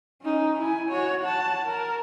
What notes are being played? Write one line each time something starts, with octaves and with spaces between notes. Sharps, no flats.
C#4 D#4
E4 G#5
F#4 C#5
F#5 A5
A#4